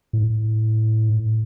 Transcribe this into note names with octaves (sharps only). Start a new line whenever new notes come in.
A2